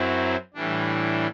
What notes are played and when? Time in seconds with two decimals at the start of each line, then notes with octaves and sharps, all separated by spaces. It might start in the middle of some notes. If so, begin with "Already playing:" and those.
Already playing: F#2 F#3 C4 E4
0.54 A2 E3 G3 D4